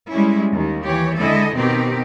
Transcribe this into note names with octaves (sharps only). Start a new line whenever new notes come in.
G3 G#3 C#4 E4
D#2 D#3
E3 G4 C#5
D3 G#3 E4 A4 D#5
B2 D#3 C4 D#4 G4